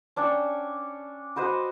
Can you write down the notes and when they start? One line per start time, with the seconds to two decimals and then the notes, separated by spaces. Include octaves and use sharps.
0.16 C#4 D4 C#5 G5
1.36 F#4 B4 C5 D#5